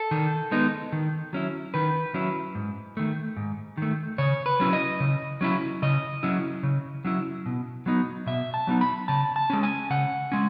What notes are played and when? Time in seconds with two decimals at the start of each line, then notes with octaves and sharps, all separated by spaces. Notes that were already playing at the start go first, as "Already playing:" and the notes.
Already playing: A4
0.11 D#3
0.51 G#3 B3 D#4
0.92 D#3
1.33 F#3 C#4 E4
1.74 D#3 B4
2.14 F#3 C#4 E4
2.55 G#2
2.97 D#3 A3
3.37 G#2
3.77 D#3 A3
4.18 C#3 C#5
4.46 B4
4.60 F#3 C#4 E4
4.73 D#5
5.00 C#3
5.41 F#3 C#4 E4
5.82 C#3 D#5
6.23 F#3 C#4 E4
6.63 C#3
7.05 F#3 C#4 E4
7.46 B2
7.86 F#3 B3 D#4
8.26 B2 E5
8.54 A5
8.67 F#3 B3 D#4
8.81 B5
9.08 C#3 A5
9.36 A5
9.50 G#3 C#4
9.63 G#5
9.90 C#3 F#5
10.32 G#3 C#4